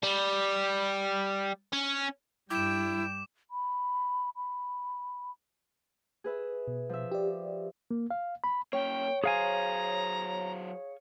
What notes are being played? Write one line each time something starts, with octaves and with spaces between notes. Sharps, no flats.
G3
C#4
G2 G3 E4 G5 D6 E7
B5
B5
G#4 B4 E5
B2
F3 E5
G4 D5
A#3
F5
B5
A#3 C#4 C#5 G5
F#3 G#4 C5 F5 G#5 A#5